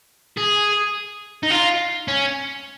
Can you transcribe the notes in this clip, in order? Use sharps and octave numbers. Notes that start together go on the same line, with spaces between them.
G#4
D#4
F4
C#4